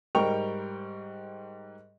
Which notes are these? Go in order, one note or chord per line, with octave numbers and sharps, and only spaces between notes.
G#2 G3 A#4 G5 C#6 F7